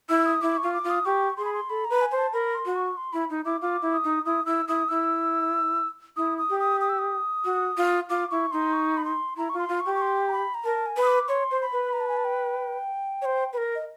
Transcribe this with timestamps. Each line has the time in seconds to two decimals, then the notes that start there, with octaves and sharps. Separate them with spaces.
0.09 E4 E6
0.26 D#6
0.41 E4 D6
0.57 C#6
0.63 F4
0.73 D6
0.84 F4
0.90 D#6
1.05 G4 C#6
1.37 G#4 C6
1.45 B5
1.54 C6
1.70 A4 B5
1.85 A#5
1.90 B4
2.01 G#5
2.12 C5
2.17 A5
2.33 A#4 B5
2.55 C6
2.65 F#4
2.75 C#6
2.97 C6
3.13 E4 B5
3.30 D#4
3.45 E4 D6
3.62 F4 D6
3.82 E4
3.93 D#6
4.04 D#4
4.25 E4 D#6
4.46 E4 E6
4.68 E4 D#6
4.89 E4 E6
6.17 E4 D#6
6.38 D#6
6.50 G4
6.60 D#6
6.81 D#6
6.89 E6
6.99 D#6
7.45 F#4
7.78 F4
8.10 F4 D6
8.30 E4 C#6
8.51 D#4 C6
8.73 C#6
8.97 B5
9.05 C6
9.37 E4 A#5
9.50 C#6
9.54 F4 C6
9.69 F4
9.80 C#6
9.86 G4
9.95 C#6
10.02 C6
10.28 A#5
10.33 B5
10.55 A#5
10.65 A#4 A5
10.86 G#5
10.97 B4
11.02 D#6
11.07 D6
11.29 C#5 C6
11.51 C5
11.62 B5
11.72 B4
11.93 A#5
12.01 A5
12.08 G#5
12.17 A5
12.25 G5
13.22 C#5
13.25 C5
13.53 B4
13.58 A#4
13.75 D#5